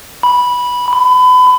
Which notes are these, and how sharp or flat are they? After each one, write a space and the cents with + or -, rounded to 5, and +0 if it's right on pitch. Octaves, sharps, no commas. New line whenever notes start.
B5 -10
B5 +30